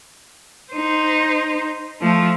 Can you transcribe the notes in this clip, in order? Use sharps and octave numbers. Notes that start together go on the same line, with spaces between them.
D#4 C5
F3 A3